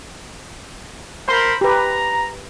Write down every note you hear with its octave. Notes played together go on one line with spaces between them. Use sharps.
A#4 C5 B5 C6
G4 B4 A#5